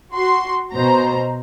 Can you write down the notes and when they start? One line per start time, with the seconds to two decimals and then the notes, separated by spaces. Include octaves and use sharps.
0.13 F#4 C6
0.72 B2 C5 A#5